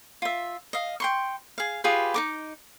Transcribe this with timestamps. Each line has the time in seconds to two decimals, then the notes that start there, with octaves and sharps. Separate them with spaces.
0.22 F4 E5
0.73 D#5 F5
1.00 G5 C6 C#6
1.58 G#4 F5
1.84 F4 G4 G#4 B4
2.14 D#4 A#4 D6